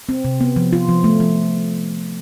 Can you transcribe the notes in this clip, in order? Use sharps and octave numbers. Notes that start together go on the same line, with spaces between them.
C4
C3
B3
F3
F4
F3
A3
F3